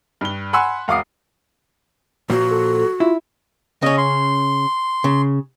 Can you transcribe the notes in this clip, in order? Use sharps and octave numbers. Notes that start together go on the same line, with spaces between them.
G2 G7
F#5 G#5 B5 C6 E6 F#6
E1 F5 F#5 D6 D#6 C7
A#2 F3 F#4
A4
E4 F4
C#3 C#4 D#5
C6
C#3